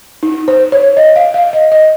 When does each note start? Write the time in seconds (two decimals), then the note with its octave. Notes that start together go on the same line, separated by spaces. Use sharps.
0.23 D#4
0.48 C5
0.72 C#5
0.97 D#5
1.16 F5
1.34 F5
1.53 D#5
1.72 D#5